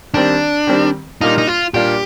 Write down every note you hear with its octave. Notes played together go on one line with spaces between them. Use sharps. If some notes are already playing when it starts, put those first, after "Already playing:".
D#3 G3 C4 D4
D#3 G3 C4
A#2 G3 A#3 D4 D#4 F4
D#4
F4
A#2 G3 A#3 D4 F4 G4